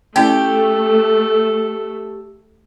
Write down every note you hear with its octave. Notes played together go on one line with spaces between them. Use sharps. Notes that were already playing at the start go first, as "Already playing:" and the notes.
A3 C#4 E4 G4 A4 D5